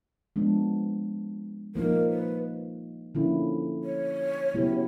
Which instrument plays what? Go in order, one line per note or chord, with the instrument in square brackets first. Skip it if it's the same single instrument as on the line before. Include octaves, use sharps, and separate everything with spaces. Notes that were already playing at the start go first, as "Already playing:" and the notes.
[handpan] F3 G#3 B3 D4
[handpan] F3 A#3 D#4 [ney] A#4
[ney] B4
[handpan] D3 F3 A#3 C#4 E4
[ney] C#5
[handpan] C#3 F#3 B3 E4 G4